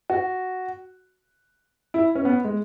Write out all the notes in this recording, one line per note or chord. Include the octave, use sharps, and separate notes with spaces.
F#4
E4
C#4
B3
G#3